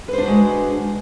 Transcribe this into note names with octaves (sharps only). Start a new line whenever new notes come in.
G#3 D4 F#4 B4 C5